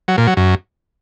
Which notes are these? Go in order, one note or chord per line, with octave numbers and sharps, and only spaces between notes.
F#3
A#2
F#3
F#2